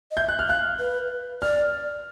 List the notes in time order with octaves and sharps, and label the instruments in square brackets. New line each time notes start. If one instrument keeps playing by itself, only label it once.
[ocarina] D#5
[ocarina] E5 [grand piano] G6
[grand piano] F#6
F6
[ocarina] F5 [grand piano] F#6
[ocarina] B4
[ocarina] D5 [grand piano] F6